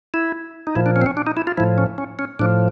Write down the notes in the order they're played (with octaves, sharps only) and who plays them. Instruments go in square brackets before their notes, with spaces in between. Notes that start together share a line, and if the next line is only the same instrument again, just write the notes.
[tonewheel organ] E4
D#4
A#2 F3 E4
D4
C#4
C4
C#4
D4
D#4
E4
F4
A2 F3 E4
C#4
C#4
C#4
A2 F3 D4